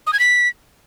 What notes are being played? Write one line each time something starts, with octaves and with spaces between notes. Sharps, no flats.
D#6
G#6
B6